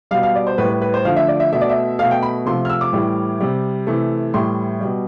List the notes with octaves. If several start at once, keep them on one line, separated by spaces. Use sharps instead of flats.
B2 G3 F5
F5
D5
C5
A2 G3 B4
B4
B4
C5
D3 F3 A3 F5
E5
D5
E5
B2 A3 E5
D5
E5
B2 A3 F5
G5
B5
C3 F3 A3 C6
F6
E6
D6
A2 E3 G3
C3 G3
C3 E3 A3
A2 E3 G3 C6
B2 G3